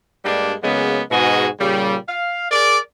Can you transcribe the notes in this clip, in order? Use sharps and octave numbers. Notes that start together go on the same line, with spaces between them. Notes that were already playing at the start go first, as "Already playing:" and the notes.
G2 G3 G#3 A#3 D4
C#3 F#3 G#3 A#3 B3
G#2 B2 F#4 G#4 D#5
A#2 C#3 G3
F5
G#4 A#4 D5